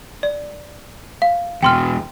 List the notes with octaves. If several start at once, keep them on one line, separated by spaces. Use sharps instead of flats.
D5
F5
E2 B2 G5 C6 F6